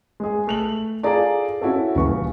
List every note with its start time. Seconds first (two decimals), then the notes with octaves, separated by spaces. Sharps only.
0.20 G#3 G#4
0.47 A3 F7 F#7
1.03 F4 G#4 A4 D5 A#5 D6
1.62 C#4 E4 F#4 A4
1.95 D#1 C#3 E3 C#6